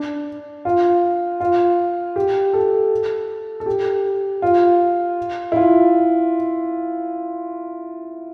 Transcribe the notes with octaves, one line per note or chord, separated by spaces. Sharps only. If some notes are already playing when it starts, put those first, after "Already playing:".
Already playing: D4
F4
F4
G4
A4
A4
G4
F4
E4
F4